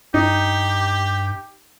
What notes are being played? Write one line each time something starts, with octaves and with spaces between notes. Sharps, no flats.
G2 D#4 G4